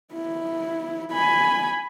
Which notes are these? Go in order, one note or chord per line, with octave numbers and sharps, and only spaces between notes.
E4
G#5 B5